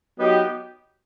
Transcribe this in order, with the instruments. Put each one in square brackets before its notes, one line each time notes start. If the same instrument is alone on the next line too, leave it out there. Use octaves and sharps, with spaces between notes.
[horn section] F#3 B3 D#4 G4